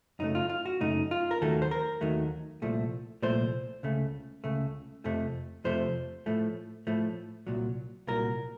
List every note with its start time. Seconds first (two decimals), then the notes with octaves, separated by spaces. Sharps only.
0.19 F#2 C#3 A3 D#4
0.35 F4
0.49 F4
0.66 F#4
0.80 F#2 C#3 A3 D#4
1.11 F4
1.31 A#4
1.41 D#2 D#3 F#3 A3 A4
1.62 C5
1.71 A#4
2.01 D#2 D#3 F#3 A3
2.62 C2 A#2 F3 A3
3.22 C2 A#2 F3 A3 C5
3.83 C#2 C#3 A3
4.44 C#2 C#3 A3
5.04 F2 C3 F3 A3
5.64 F2 C3 F3 A3 C5
6.26 A2 F3 A3
6.87 A2 F3 A3
7.47 C2 A#2 F#3
8.08 C2 A#2 F#3 A#4